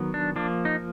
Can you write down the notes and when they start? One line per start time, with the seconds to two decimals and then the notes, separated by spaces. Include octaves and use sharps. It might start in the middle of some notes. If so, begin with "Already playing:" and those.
Already playing: D#3 F#3 B3
0.14 D4
0.36 F3 A#3 D4
0.65 D#4